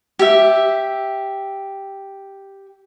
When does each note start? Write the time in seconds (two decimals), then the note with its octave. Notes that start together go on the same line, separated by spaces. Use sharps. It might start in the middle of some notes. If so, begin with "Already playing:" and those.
0.19 G4 E5